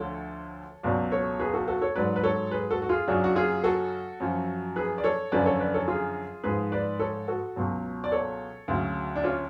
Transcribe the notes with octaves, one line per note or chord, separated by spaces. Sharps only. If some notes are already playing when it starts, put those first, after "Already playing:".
Already playing: D2 D3 F3 A4 C#5
C#2 B2 F#3 B4 D5
A4 C#5
G#4 B4
F#4 A4
F#4 A4
A4 C#5
G#2 F#3 B4 D5
B4
A4 C#5
G#4 B4
F#4 A4
F#4
F4 G#4
F#2 C#3 F#3 D4 F#4
F#4
F4 G#4
F#4 A4
F#2 F3
G#4 B4
D5
A4 C#5
F#2 D3 F3 B4 D5
A4 C#5
B4 D5
A4 C#5
F4 G#4
G#2 F3 G#4 B4
B4 D5
A4 C#5
F#4 A4
C#2 B2 F#3
D5
A4 C#5
D2 C#3 F#3
D4
C#4 F4